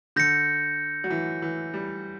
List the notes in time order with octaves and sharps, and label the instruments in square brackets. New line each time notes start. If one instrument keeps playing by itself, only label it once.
[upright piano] D3 [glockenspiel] G6 A#6 C#7
[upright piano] F#3
E3
E3
G3